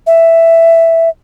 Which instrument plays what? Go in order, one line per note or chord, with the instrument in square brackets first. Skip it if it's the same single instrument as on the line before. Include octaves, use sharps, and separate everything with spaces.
[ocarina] E5